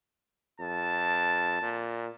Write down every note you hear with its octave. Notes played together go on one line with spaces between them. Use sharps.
F2 A5
A#2